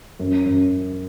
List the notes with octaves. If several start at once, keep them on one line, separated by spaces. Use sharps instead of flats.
F#2
F#2